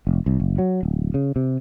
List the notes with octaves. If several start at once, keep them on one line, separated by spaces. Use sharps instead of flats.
F1
C2
F#1
F#3
D1
C#3
C3